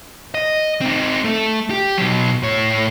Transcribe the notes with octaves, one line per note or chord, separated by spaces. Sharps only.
D#5
C4 D#4
A3
G4
B2 F#3
A2 C#5